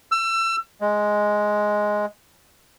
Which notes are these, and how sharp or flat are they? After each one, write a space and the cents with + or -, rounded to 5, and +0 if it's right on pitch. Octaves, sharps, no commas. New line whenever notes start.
E6 +30
G#3 +5